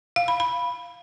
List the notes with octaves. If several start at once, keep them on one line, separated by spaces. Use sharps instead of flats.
F5
B5
B5